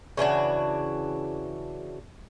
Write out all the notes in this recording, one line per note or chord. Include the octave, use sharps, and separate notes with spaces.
C#3 E3 D4 F#4